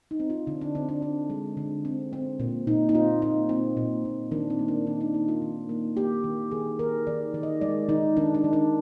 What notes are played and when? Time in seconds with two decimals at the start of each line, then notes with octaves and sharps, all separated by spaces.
0.11 D#4
0.20 C4
0.30 F4
0.47 D3 D4
0.61 D4
0.75 D3 C4
0.89 D4
1.02 C4 D4
1.30 G#3
1.57 D3
1.85 C4
2.13 C4
2.40 A#2
2.67 A#2 D#4
2.89 D#4
2.95 C4 F4
3.22 A#2 D#4
3.49 C4
3.77 A#2
4.05 A#2
4.31 D#3 D4
4.50 C4
4.59 A#3
4.68 D4
4.87 D#3 D#4
5.01 D4
5.14 A#3 D#4
5.28 F4
5.42 D#3
5.69 A#3
5.96 A#3 G4
6.24 D#3
6.51 D#3 G#4
6.79 D#3 A#4
7.07 D#3 D5
7.34 D#3
7.43 D#5
7.61 G#3 D5
7.89 D#3 D#4
8.17 D#3 D4
8.35 D4
8.44 D#3
8.53 D4